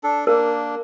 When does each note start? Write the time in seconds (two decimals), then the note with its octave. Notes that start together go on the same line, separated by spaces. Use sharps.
0.03 D4 A4
0.27 A#3 D4 A#4